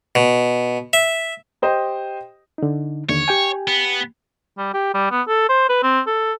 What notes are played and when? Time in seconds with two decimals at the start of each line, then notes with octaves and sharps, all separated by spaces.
0.15 B2
0.93 E5
1.62 G4 C5 D#5 G5
2.58 D3 D#4
3.09 D#2 D3 C#5
3.28 G4 G5 G#5
3.68 B3
4.58 G3
4.73 G4
4.94 G3
5.11 B3
5.28 A4
5.49 C5
5.69 B4
5.83 C4
6.07 A4